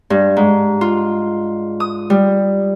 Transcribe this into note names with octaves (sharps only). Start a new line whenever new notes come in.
G2
G#2
F4
D#6
G3